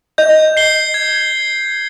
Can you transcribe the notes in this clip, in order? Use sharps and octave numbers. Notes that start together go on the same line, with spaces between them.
D#5 G6
C7 G7
G#6